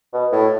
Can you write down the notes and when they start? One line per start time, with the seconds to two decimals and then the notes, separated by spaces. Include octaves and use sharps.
0.13 B2
0.32 A2